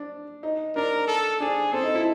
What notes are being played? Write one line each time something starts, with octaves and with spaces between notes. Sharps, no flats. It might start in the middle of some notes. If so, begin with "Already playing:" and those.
Already playing: D4
D#4
D4 A#4
A4
D4 G#4
C4 A4
D#4
E4